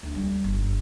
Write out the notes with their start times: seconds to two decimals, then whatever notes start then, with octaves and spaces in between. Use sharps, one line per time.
0.03 D2
0.15 G3
0.44 G1